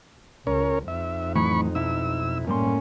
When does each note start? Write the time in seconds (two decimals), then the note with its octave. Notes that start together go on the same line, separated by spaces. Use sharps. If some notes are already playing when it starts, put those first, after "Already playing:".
0.47 C#2 C#4 A#4 C#5
0.88 F2 D#4 E5
1.36 A2 E3 F#3 B5 C#6
1.75 B1 E4 E6
2.47 F#2 A2 G3 A#3 C#4 C6